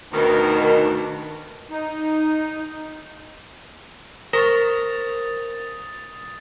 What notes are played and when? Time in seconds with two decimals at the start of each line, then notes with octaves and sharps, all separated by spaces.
0.13 D2 B2 D#3
1.71 D#4
4.33 A#4 C5 A#5 C#6 D#6 A6